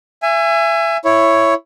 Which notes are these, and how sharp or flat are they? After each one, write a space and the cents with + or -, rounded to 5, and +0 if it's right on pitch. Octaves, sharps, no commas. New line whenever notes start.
E5 +30 G#5 -10
E4 +10 C#5 +0